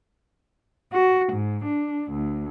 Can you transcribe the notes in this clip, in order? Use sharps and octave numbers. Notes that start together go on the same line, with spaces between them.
F#4
G#2
D4
D2